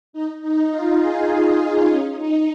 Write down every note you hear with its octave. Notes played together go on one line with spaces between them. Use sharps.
D#4
D#4
F4
G#4
D#4
C#4
D#4